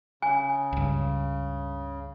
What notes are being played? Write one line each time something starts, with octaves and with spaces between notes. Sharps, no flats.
C#3 G#5
C#2 G2